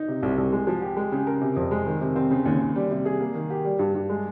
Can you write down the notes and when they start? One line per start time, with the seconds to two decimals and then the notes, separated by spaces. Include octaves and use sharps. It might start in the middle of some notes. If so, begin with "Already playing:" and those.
Already playing: D#4
0.08 C3
0.23 C2
0.38 C2
0.52 G#3
0.67 F3
0.82 G4
0.97 G#3
1.12 C#3
1.27 A#4
1.41 C3
1.56 F2
1.71 G#3
1.86 D#3
2.01 C3
2.16 C4
2.30 C#3
2.46 D#2
2.60 D#2
2.76 G3
2.91 C3
3.05 G#4
3.20 A#3
3.35 D#3
3.50 G4
3.65 G3
3.79 G2
3.94 G2
4.09 G#3